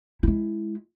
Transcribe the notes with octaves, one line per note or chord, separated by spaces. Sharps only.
G#3 E4